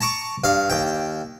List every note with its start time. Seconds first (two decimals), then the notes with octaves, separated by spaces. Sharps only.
0.01 A5 A#5 C#6 D6
0.44 G2 F5
0.70 D#2 G5